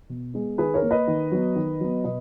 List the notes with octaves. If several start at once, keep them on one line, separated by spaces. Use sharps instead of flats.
B2
G#3 B3
D#3 G#4 B4
A#4 C#5
A#3
B4 D#5
D#3
F#3 B3
D#3
F#3 B3
B2 B4 D#5